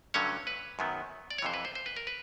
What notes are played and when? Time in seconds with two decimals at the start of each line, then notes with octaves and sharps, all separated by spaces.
0.14 G2 D3 F#3 A3 C#4 C#5
0.47 B4
0.79 F#2 D#3 F#3 B3
1.31 D5
1.38 C#5
1.42 F2 C3 E3 C5
1.54 B4
1.65 C5
1.75 C5
1.86 B4
1.96 A#4
2.07 B4